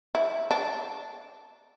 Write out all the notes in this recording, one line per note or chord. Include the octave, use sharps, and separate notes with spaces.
E4
D4